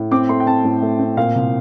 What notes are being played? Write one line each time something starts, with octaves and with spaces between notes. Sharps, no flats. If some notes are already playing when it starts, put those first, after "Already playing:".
Already playing: A2
C4 D6
A3 C6
G5
C4 A5
A2
A3
C4
A#2 F5
C2